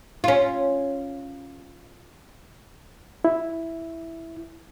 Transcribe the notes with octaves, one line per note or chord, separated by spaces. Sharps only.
C#4 F4
E4